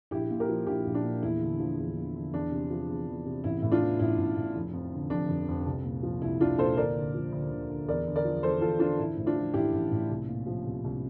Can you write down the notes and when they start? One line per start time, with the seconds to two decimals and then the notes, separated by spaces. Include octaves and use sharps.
0.11 A#1 E4 G4
0.31 A#2
0.40 G4 A#4
0.49 F3
0.67 A#1 E4 G4
0.86 A#1
0.95 D4
1.04 A#2
1.22 E2 E4
1.41 D3
1.59 F3
1.78 E2
1.97 E2
2.15 D3
2.33 E2 D4
2.51 C3
2.70 F3
2.89 E2
3.08 E2
3.26 C3
3.44 A1 E4
3.62 A2
3.72 D4 F4
3.82 E3
3.99 A1 E4
4.18 A1
4.36 A2
4.56 F1
4.73 F2
4.92 D3
5.10 F1 D4
5.29 F1
5.48 F2
5.66 C2
5.84 A#2
6.03 F3
6.22 C2 E4
6.40 C2 D4 F4
6.58 A#2 A4 C5
6.77 D2 A#4 D5
6.96 D3
7.14 F3
7.32 D2
7.51 D2
7.69 D3
7.89 E2 A#4 D5
8.07 D3
8.16 A#4 D5
8.25 F3
8.43 E2 A4 C5
8.61 E2 F4 A4
8.80 D3 D4 F4
8.99 A1 E4
9.17 A2
9.26 D4 F4
9.36 F3
9.54 A1 E4 G4
9.73 A1
9.91 A2
10.10 C2
10.28 A#2
10.46 F3
10.65 C2
10.84 C2